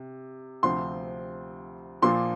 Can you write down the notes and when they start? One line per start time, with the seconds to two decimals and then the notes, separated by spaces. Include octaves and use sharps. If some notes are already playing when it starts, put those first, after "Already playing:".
Already playing: C3
0.63 D2 C3 F3 C4 C6
2.02 A#2 F3 A#3 C6